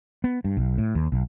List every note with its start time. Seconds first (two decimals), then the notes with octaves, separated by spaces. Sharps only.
0.24 B3
0.44 G2
0.57 B1
0.78 A2
0.95 D#2
1.12 B1